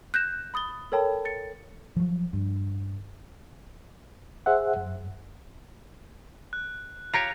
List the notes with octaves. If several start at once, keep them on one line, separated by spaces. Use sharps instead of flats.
F#6 G6 A#6 E7
B5 D#6 A6 G7
A4 A#4 C#5 G5 A5 B5
A6 C#7
F3 F#3
G2
G#4 C5 E5 F#5
F#2
F#6
F4 G4 C#5 A#5